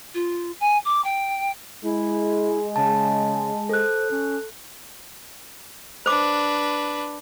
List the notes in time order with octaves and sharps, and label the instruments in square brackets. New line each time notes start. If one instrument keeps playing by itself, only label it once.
[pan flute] F4
G#5
D6
G5
[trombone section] G#3 [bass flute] E4
[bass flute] C#3 [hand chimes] A5
[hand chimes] A4 F#6 [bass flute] C5
[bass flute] C#4
[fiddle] D4 B4 [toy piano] C5 D6